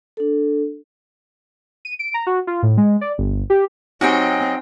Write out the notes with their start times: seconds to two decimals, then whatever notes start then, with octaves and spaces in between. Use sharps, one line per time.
0.17 D4 A4
1.85 D#7
1.99 D7
2.14 A#5
2.27 F#4
2.47 F4
2.63 A2
2.77 G#3
3.01 D5
3.18 G1
3.50 G4
4.01 F#3 C4 D#4 F#4 G4 D#5 G5 G#5